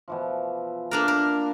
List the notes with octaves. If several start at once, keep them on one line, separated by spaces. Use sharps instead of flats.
B2 E3 F3
A#3 D4 A#4
A#3 A#4 B5